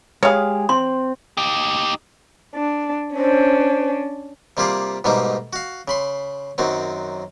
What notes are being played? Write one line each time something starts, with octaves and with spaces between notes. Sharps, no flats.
G#3 G4 G#4 C#5 F5
C4 C6
D#4 G4
D4
C#4 D4 C5
C3 G3 A#3 F4 G4 G#4
G#2 B2 G3 A3 A#3 D#4
F#4 F5
C#3 B5 C6
F#2 D#3 F#3 C4